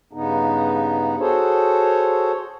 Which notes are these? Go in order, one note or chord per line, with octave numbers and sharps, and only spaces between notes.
G2 C#3 B3 D#4
F#4 G#4 A4 C5 C#5